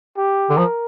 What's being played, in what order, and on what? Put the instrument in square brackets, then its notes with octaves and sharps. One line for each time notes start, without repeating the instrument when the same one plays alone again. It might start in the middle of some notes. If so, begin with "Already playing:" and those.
[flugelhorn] G4
[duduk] D3
[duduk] F3 [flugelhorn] A#4